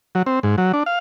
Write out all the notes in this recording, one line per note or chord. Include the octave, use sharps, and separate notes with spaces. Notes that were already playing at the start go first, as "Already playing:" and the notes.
F#3
C4
G#2
F#3
D4
F5